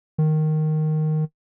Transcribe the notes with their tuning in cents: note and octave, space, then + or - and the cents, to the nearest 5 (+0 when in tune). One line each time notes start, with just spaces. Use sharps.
D#3 -5